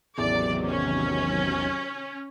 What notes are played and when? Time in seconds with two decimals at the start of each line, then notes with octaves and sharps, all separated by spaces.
0.18 A1 E2 C3 D#3 F#3 D5
0.68 C#4